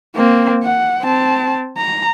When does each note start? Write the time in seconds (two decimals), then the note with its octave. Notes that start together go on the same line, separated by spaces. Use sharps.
0.16 A#3 C4
0.64 F#5
1.03 C4 A5
1.77 A#5